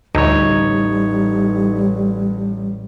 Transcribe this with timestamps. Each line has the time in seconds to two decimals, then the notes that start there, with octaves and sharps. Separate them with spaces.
0.15 A1 D2 G3 D#4 C#5